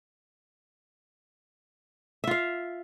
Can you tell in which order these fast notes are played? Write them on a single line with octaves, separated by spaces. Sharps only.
E5 F4 F5